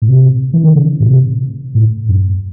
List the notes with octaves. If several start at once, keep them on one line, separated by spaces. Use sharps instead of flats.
A2
C3
E3
D#3
C#3
A2
C3
A2
F#2